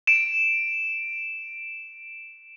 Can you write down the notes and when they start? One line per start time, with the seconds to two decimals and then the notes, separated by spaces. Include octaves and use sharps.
0.07 D7 E7